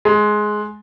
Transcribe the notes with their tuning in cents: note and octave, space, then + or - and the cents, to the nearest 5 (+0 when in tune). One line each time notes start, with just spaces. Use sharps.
G#3 +15